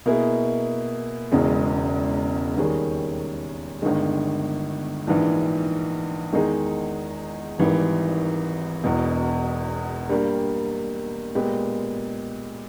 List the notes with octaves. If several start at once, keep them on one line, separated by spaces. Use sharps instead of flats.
B2 A#3 E4 G#4
E1 E2 C#3 G#3
D#2 D#3 G3 C#4 G#4
G1 G2 D#3 G#3
A#1 G#2 E3
E2 D#3 G#3 D#4 G#4
G#1 G#2 E3 G3
E1 E2 B2
G2 G3 A#3
A#2 G#3 B3 G4